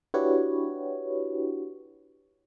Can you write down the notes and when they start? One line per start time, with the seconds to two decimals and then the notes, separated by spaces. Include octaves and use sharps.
0.14 D4 E4 F#4 G4 B4 C#5